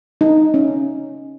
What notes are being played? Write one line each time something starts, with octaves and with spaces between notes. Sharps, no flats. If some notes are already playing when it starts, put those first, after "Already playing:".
D#4
C#4